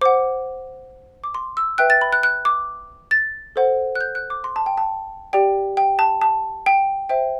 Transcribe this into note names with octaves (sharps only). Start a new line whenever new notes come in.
C5 F#5 D6
D6
C6
E6
B4 E5 G5 F#6
A6
B5
F#6
F#6
D6
A6
A4 C5 F#5
F#6
G6
F#6
D6
C6
A5
G5
A5
G4 D5 G5
G5
A5
A5
G5
C5 E5 G5